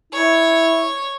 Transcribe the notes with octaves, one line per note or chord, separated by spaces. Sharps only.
E4 C#5